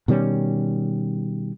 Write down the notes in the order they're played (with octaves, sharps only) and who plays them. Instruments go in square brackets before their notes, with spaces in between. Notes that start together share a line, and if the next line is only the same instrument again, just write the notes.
[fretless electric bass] B2 D#3 G3 C#4